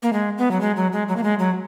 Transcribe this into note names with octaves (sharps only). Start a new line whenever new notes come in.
A#3
G#3
B3
F#3
G#3
F#3
G#3
F#3
A#3
G#3
F#3